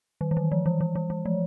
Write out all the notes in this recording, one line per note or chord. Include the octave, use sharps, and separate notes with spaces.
D#3
E3
D#3
F3
E3
E3
E3
E3
F3